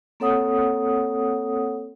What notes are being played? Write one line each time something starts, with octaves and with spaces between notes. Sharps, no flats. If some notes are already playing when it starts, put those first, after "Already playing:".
A#3 C4 A4 C#5 F#5 D#6